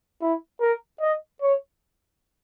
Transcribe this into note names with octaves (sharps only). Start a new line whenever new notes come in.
E4
A#4
D#5
C#5